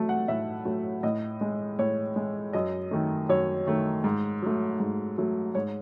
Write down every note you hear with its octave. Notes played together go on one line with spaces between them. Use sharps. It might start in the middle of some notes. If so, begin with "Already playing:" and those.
Already playing: F#3 A3 A5
F#5
A2 E5
F#3 A3
A2 D#5
G#3
A2 C#5
G#3
F#2 D#5
D#3 A3
F#2 C#5
D#3 A3
G#2
F#3 A3
G#2
F#3 A3
G#2 C#5